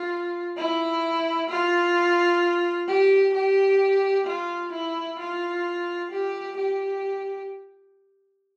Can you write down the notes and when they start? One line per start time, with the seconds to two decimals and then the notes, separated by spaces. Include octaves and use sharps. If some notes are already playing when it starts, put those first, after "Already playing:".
Already playing: F4
0.57 E4
1.49 F4
2.88 G4
3.34 G4
4.26 F4
4.72 E4
5.19 F4
6.11 G4
6.57 G4